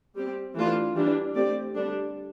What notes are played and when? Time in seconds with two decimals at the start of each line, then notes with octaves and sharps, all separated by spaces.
0.15 G3 C4 G4
0.55 E3 A3 D4 F4
0.95 E3 G3 D4
1.34 A3 C4 G4 D5
1.75 D3 G3 D4